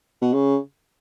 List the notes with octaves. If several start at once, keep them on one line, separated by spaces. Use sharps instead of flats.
B2
C#3